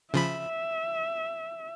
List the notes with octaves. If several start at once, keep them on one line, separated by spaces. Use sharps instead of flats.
C#3 F3 E5 B5